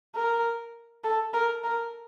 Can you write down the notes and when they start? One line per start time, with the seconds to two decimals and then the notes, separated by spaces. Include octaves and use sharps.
0.15 A#4
1.04 A4
1.34 A#4
1.64 A#4